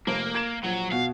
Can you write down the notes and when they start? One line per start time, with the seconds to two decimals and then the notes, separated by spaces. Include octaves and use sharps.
0.07 F1 A#3
0.35 G#6 D7 E7
0.64 A#1 F#3
0.92 B2 F#4 F5